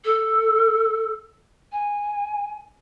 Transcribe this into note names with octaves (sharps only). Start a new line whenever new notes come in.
A4
G#5